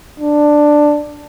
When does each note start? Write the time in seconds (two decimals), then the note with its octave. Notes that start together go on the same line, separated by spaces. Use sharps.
0.20 D4